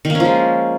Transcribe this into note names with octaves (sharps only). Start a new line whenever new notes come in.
D#3
A#3
C#4
F3
G#3